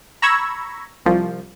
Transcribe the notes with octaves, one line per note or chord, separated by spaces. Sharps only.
A#5 B5 C#6 E6 G#6 A#6
C2 F3